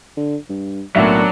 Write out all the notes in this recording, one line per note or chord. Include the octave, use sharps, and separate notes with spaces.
D3
G2
B1 A2 F#3 A#3 D4 E5